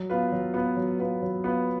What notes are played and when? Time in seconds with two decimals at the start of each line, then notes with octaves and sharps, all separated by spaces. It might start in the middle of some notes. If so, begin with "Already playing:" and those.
Already playing: F#3
0.10 B3 F4 B4
0.32 F#3
0.54 B3 F4 B4
0.77 F#3
0.99 B3 F4 B4
1.22 F#3
1.44 B3 F4 B4